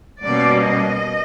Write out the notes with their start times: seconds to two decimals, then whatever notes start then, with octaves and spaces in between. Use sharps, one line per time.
0.24 B2 G3 A#3 C#4 D5
0.62 D#5